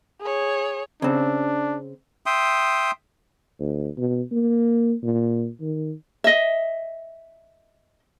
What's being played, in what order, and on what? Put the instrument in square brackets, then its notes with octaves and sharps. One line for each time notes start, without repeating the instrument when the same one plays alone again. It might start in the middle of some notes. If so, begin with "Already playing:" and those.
[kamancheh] G#4 C#5
[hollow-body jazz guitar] C#3 C4 [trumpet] D4
[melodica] E5 G5 C6 D#6
[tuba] D2
B2
A#3
A#2
D#3
[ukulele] D#5 E5